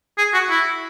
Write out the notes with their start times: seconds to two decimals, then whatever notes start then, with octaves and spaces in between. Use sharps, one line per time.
0.18 G#4
0.33 F#4
0.50 E4